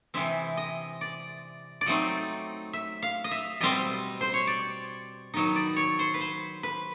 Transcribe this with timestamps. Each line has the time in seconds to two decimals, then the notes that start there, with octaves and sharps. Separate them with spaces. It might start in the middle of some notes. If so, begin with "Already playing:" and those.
0.14 C3 E3 G#3 C4 E5
0.57 D#5
1.01 D5
1.81 D5
1.86 F#3 A3 C4 D#4 D#5
2.73 E5
3.02 F5
3.24 D#5
3.31 E5
3.60 B2 G3 C4 D#5
4.21 C5
4.34 C#5
4.47 D5
5.34 D#3 F#3 B3 D#4 D#5
5.56 D5
5.76 C#5
5.99 C5
6.14 B4
6.21 C5
6.63 B4